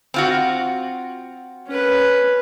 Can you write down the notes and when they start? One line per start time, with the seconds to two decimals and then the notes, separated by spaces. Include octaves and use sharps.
0.14 C4 F4 F#4
1.67 C#4 B4